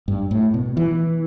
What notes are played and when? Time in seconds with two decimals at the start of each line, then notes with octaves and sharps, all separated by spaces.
0.08 G2
0.31 A2
0.54 B2
0.77 E3